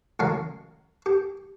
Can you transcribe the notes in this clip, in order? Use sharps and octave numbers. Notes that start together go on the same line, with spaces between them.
A1 F#2 C#3 G#3 F5 A#5
G4